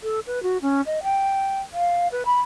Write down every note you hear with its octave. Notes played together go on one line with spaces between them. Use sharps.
A4
B4
F#4
C#4
D#5
G5
F5
B4
B5